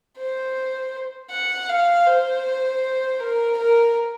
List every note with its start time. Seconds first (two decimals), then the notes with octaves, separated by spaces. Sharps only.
0.18 C5
1.31 F#5
1.69 F5
2.06 C5
3.20 A#4
3.57 A#4